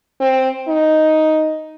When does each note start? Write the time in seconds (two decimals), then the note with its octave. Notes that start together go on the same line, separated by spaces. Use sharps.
0.20 C4
0.68 D#4